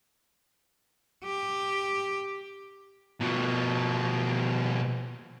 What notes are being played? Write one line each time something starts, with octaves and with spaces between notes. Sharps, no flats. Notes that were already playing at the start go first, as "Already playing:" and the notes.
G4
B2 F3